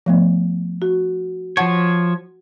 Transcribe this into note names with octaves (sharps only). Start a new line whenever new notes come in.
F3 A3 B3
F#4
F3 C#5 F#5 A5